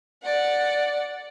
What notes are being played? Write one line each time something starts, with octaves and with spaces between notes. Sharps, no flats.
D5 F#5